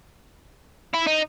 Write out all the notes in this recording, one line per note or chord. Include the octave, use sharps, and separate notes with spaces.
E4
D#4